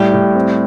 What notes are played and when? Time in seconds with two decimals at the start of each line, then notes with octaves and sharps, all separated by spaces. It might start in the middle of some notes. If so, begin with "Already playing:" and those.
Already playing: A2 G3 G4
0.13 A2
0.35 C4